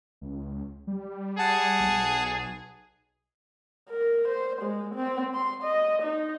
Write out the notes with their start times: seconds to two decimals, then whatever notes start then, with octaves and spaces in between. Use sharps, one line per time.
0.21 C#2
0.87 G3
1.39 G#4 F#5 A5
1.81 B1
3.89 A#4
4.28 C5
4.62 G#3
4.95 C4
5.34 C6
5.63 D#5
6.02 D#4